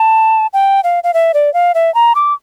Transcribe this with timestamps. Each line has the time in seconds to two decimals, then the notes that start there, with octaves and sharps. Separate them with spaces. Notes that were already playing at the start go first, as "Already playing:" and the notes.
Already playing: A5
0.53 G5
0.84 F5
1.04 F5
1.14 E5
1.34 D5
1.54 F5
1.75 E5
1.95 A#5
2.15 D6